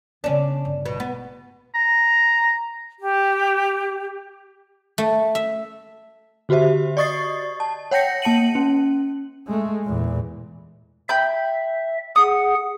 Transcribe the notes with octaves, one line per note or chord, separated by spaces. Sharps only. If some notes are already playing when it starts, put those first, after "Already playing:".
C#3 B3 C#4 D4
G1
B2
B3
A#5
G4
A3
E5
D3 F#4 G4 C5 E5
D5 D#5 C#6 D#6 A6 C7
A5
C#5 F#5 G5 G6 A#6 C#7
A#3 A5 C#7 D#7 F#7
C#4
G#3 A3
E2 A#2
E5 G5 B5 G6
G#4 F#5 D#6